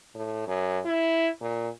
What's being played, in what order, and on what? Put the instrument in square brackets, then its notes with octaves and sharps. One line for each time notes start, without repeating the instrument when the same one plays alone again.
[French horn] A2
F#2
E4
A#2